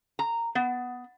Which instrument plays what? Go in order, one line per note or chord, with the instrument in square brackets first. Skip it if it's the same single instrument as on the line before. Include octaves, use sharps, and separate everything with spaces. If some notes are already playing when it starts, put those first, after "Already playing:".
[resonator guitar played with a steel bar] A#5
B3